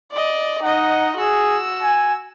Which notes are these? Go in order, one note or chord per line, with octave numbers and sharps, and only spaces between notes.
D5 D#5
D#4 D#5 F#5
F#4 G#4 E6
G#5